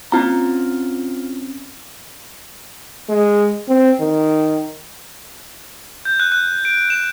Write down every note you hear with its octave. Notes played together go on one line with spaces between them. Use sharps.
C4 C#4 F4 A#5
G#3
C4
D#3
G6
F#6
F#6
D7
E7